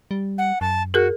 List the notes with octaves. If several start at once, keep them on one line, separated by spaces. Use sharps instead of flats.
G3
F#5
F#2 A5
F#4 G#4 A#4 F#6